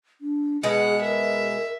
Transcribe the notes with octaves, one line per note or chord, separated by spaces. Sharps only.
D4
B2 G#3 G#4 F#5
A#4 E5